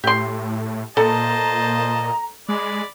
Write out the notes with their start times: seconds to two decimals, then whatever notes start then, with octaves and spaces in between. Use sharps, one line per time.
0.04 A2 G4 C6
0.97 A#2 A4 C5 D#5 A5 A#5
2.49 G#3 D5 B5